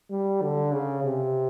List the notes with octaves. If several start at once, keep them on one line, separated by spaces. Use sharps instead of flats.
G3
D3
C#3
C3